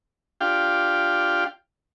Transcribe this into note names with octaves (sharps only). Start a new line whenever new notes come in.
D4 F4 G4 F5 G5